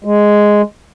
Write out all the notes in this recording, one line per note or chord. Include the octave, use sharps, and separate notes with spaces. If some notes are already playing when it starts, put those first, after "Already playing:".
G#3